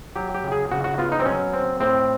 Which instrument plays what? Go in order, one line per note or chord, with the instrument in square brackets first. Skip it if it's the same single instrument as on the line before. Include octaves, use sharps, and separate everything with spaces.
[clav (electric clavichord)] F#3 G4
G4
C#3
G#4
C#3 F#4
F#4
B3 F4
D#4
C4
F#3 C#4
C4
A2 C4